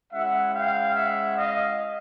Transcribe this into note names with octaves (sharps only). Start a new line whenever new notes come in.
G#3 C#4 E4 E5 F#5
F5 G5
E5 F#5
D#5 F5